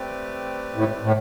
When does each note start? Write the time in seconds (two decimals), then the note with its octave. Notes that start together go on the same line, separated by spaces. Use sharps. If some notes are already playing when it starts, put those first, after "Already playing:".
Already playing: A3 C4 G4 B4 D5
0.76 A2
1.04 A2